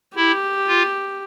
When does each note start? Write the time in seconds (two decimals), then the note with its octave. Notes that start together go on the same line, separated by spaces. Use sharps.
0.17 E4 G4
0.67 F4